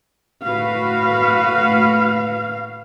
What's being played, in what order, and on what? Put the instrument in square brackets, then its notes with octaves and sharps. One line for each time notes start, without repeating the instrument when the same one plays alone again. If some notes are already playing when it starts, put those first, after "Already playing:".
[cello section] A2 F#4 B4 [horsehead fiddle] F5